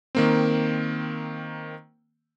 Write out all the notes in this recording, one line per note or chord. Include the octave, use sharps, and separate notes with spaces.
D#3 A#3 C4